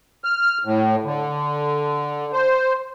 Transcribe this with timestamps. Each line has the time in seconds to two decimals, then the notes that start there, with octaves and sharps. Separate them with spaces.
0.24 F6
0.65 A2
1.05 D3
2.33 C5